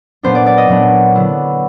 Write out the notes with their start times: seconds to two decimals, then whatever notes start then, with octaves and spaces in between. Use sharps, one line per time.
0.23 A#2 F#3 B3 D4 C5
0.35 D5
0.46 D5
0.58 D#5
0.68 A#2 F#3 B3 D4
1.15 D3 F#3 B3 E4